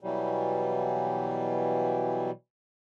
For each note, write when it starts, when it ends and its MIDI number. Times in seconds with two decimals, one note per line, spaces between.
0.01 2.31 47
0.01 2.31 52
0.01 2.31 54
0.01 2.31 55